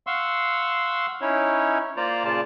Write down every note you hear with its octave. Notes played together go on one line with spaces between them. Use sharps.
F5 F#5 C6 C#6 E6
C#4 D#4 E4 C#5
A#3 F4 C5 D5 A#5
A#2 C#3 F4 D5 A5